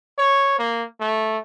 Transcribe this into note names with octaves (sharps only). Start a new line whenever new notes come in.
C#5
A#3
A3